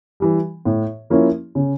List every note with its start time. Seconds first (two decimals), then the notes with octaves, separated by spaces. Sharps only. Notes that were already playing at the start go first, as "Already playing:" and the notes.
0.20 E3 G3
0.65 A2
1.10 F3 A#3 C#4 E4
1.55 C#3